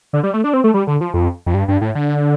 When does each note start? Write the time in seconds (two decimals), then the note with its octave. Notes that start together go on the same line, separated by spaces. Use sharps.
0.13 D3
0.23 G3
0.34 A3
0.44 D4
0.54 C4
0.64 A3
0.74 G3
0.87 D3
1.01 F3
1.14 F2
1.46 F2
1.54 G2
1.68 G2
1.81 A2
1.95 D3